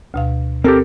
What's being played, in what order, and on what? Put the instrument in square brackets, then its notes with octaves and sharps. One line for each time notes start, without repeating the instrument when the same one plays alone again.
[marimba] D2 B2 F5
[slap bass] C4 [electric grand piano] G4 A4 A#4